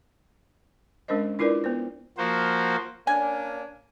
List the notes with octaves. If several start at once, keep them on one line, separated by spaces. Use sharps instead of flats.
G#3 C#4 D4 A#4 C5 D#5
D4 E4 F4 A#4 B4 D5
B3 B4 C5
F3 A#3 F#4 C5
A#3 C#4 D4 G#5